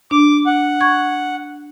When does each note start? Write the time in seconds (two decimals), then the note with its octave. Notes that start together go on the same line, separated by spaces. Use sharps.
0.11 D4 D6
0.46 F#5
0.81 C#6 G#6